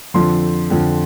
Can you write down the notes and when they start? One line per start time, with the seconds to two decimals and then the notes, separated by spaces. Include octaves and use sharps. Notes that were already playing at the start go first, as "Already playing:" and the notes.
0.14 F2 D3 F3 C6
0.70 F2 D3 F3